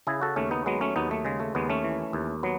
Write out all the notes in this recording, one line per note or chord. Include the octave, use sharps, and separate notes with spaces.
C#3 E4 G#4
F#4 A4
D#2 A3 C#4
B3 D#4
F#3 G#3 B3
A3 C#4
D#2 B3 D#4
A3
C#3 G#3
A3
D#2 G#3 B3
A3 C#4
E3
D#2
F#3 B3